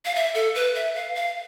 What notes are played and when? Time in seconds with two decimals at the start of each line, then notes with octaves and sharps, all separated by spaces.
0.05 F5
0.15 E5
0.35 A4
0.55 B4
0.75 E5
0.95 F5
1.15 F5